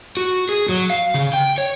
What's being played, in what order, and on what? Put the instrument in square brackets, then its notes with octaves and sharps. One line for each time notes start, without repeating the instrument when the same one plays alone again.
[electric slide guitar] F#4
G#4
F#3
F5
C#3
G5
C#5